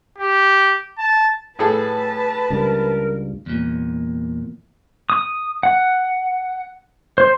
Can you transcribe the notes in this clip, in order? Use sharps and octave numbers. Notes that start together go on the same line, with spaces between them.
G4
A5
A2 G#4 A4 B4 A5
C#2 G2 A#4
E2 A#2
D#6
F#5
C5